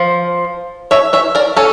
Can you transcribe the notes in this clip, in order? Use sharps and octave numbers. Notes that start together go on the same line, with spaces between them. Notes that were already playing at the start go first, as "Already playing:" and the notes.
Already playing: F3
C#5 E5
C#5 E5
A#4 D5
C#4 A4 C#5